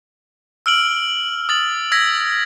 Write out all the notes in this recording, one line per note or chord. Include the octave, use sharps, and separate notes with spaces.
E6 F6 D7 F#7
D#6 A6 F#7
E6 G#6 A#6 B6